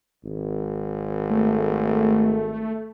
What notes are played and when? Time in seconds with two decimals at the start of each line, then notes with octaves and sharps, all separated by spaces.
0.24 G#1
1.30 A3